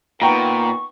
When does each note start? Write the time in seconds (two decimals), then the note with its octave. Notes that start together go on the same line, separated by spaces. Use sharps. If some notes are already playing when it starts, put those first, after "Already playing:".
0.22 A#2 B3 D#4 G5 A#5 C#6